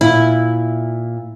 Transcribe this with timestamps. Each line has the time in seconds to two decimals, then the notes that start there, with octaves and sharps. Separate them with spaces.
0.01 A#2 E4